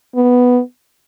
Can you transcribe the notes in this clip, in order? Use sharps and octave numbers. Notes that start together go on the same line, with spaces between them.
B3